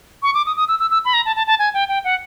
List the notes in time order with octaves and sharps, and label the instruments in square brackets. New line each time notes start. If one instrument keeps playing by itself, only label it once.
[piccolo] C#6
D6
D#6
D#6
E6
E6
E6
B5
A#5
A5
A5
A5
G#5
G5
G5
F#5